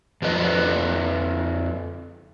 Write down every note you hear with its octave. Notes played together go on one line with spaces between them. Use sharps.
F2 F3 B4 D#5